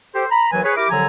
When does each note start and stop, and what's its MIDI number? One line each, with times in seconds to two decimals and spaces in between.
0.14 0.25 67
0.14 0.25 69
0.14 0.25 72
0.31 0.47 82
0.31 0.47 83
0.52 0.62 39
0.52 0.62 52
0.52 0.62 54
0.52 0.62 71
0.52 0.62 80
0.64 0.73 68
0.64 0.73 71
0.64 0.73 73
0.76 0.86 64
0.76 0.86 67
0.76 0.86 70
0.76 0.86 86
0.90 1.06 36
0.90 1.06 50
0.90 1.06 53
0.90 1.06 54
0.90 1.06 80
0.90 1.06 82